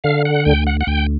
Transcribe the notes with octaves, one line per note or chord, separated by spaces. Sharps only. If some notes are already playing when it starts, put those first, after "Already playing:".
D3 F5
F#5
D2 G5
F#5
F#5
D2 G5